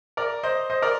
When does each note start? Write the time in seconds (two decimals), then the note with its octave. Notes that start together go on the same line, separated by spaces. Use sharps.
0.17 A#4 D5
0.43 C5 D#5
0.70 C5 D#5
0.82 A#4 D5